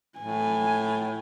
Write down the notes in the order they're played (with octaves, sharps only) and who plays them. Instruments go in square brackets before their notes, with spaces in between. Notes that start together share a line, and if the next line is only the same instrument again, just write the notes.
[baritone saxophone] A2 [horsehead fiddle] G#5